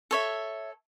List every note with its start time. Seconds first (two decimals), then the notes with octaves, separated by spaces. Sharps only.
0.11 A4 C#5 E5